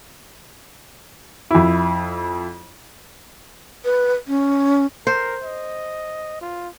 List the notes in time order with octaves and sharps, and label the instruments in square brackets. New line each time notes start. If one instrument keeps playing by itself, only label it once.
[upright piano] F2 E4
[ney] B4
C#4
[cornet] A#4 [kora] C5
[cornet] D#5
F4